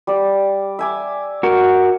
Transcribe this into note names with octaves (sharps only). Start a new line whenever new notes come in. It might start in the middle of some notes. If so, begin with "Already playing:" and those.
G3 D5
E5 G#5 D6
F#4 A#4